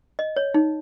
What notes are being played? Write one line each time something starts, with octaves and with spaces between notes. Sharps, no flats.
D#5
C#5
D#4